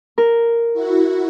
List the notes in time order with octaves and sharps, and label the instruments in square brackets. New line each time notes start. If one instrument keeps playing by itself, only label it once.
[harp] A#4
[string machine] E4 F#4